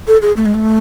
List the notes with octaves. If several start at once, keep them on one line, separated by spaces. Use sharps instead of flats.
A4
G#4
A3
G#3
A3